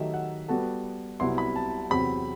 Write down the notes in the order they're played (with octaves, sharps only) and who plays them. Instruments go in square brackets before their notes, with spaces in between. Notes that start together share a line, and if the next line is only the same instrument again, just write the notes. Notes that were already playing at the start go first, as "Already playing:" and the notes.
Already playing: [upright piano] D#3 F#3 A3 D#4 G4 [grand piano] E5
[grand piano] F#5
[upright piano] G3 B3 F#4 A4 [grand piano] A5
[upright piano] C2 C3 F#3 B3 E4 [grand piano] C6
[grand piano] B5
A5
[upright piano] E2 C3 F#3 C4 [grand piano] B5